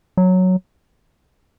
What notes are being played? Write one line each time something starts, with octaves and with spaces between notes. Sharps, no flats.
F#3